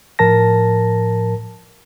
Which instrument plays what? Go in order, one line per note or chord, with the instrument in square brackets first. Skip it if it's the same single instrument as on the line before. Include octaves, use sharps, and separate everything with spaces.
[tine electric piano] A2 F3 A#4 A5 A#6